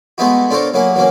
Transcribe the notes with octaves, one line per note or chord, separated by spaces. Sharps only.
G#3 A3 B3 D#4 E4 F#4
D4 F4 A4 A#4 C5 C#5
F#3 A#3 E4 G#4
E3 F#3 A#3 C#4